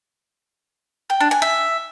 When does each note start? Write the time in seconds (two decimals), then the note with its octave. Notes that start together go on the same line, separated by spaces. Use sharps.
1.10 G5
1.20 D4
1.31 G#5
1.42 E5